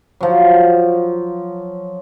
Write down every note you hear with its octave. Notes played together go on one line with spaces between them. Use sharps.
F3 F#3